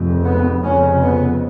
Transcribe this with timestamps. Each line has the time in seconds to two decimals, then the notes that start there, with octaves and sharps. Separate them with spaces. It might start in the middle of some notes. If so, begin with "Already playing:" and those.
Already playing: F1 F2 C#3
0.24 B3
0.63 F1 F2 C#3 C#4
1.02 B3